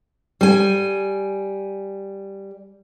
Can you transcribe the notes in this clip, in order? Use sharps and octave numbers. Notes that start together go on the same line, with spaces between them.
G3 G#5